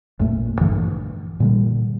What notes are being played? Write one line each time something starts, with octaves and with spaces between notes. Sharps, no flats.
A1 F2 A#2 A3
A#1 G2 D3 E3
A#2 D3 G3